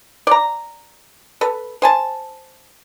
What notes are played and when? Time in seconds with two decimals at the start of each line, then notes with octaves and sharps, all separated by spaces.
0.27 D5 A#5
1.41 A4 B4
1.82 C5 G#5 A5